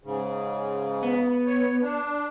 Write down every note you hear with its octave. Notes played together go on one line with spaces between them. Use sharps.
G#2 C#3
B3
C#5
D4